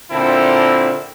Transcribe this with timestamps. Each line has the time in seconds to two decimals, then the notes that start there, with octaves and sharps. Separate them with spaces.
0.11 A#2 D3 C4 E4 A4